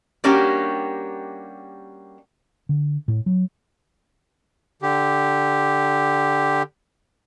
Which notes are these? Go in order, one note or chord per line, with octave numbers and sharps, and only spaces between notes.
G3 A#3 C#4 D4 F#4 G4
D3
A2
F#3
D3 G4